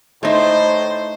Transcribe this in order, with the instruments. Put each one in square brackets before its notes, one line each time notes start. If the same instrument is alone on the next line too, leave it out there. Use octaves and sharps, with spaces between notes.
[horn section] A2 C5 [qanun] A3 D#4